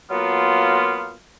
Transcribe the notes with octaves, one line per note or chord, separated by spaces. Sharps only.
F#3 A#3 B3 F4